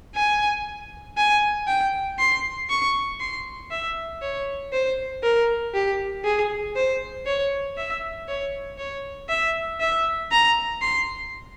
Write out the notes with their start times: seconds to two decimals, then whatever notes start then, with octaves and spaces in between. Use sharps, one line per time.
0.15 G#5
1.17 G#5
1.68 G5
2.19 C6
2.70 C#6
3.20 C6
3.71 E5
4.22 C#5
4.73 C5
5.23 A#4
5.74 G4
6.25 G#4
6.76 C5
7.26 C#5
7.77 E5
8.28 C#5
8.78 C#5
9.29 E5
9.80 E5
10.32 A#5
10.81 C6